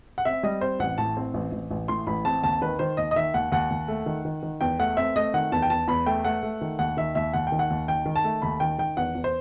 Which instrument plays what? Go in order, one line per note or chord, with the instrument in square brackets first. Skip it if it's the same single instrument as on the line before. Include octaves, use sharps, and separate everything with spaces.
[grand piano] F#5
C4 E5
G3 D#5
C4 C5
A1 F#5
A2 A5
C4
A1
A1
A1
A2 C6
A1 B5
C4 A5
D#2 A5
D#3 B4
D#3 C5
D#2 D#5
D#5
D#3 E5
D#2 F#5
D#2 F#5
D#2
A3
D#3
D#3
D#3
E2 G5
A3 F#5
C4 E5
A3 D#5
D#3 F#5
E2 A5
G5
E2 A5
E2 B5
A3 G5
A3 F#5
A3
D#3
D#2 F#5
D#3 E5
D#2 E5
D#2 F#5
G5
D#3
F#5
D#2
D#3 G5
D#3
A5
A3
D#2 B5
D#3 G5
D#3 G5
E2 F#5
E2
C5